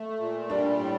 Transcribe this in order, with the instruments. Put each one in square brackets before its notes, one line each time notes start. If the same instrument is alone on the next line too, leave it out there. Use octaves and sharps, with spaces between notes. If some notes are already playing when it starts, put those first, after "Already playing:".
Already playing: [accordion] A3
A#2
[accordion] G3 [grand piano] D4
[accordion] A2